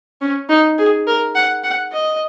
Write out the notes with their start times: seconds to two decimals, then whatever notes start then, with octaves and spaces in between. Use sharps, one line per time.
0.21 C#4
0.49 D#4
0.78 G#4
1.07 A#4
1.35 F#5
1.64 F#5
1.92 D#5